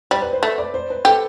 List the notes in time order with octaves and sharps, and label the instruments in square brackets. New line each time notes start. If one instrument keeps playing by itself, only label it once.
[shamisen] G3 [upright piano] C5
[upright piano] B4
C5
[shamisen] A3
[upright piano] D5
C5
B4
[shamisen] G4 [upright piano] A4